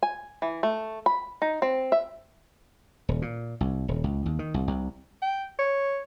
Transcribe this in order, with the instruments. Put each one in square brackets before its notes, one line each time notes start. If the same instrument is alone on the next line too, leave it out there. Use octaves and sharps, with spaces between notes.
[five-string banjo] G#5
E3
A3
B5
D#4
C4
E5
[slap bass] D#1
A#2
C2
D#1
C#2
D#2
D#3
C2
C2
[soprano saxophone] G5
C#5